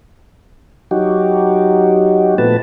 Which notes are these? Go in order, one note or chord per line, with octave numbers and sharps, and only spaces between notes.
F#3 D#4 F#4 G4
A#2 F3 A3 B3 B4 A5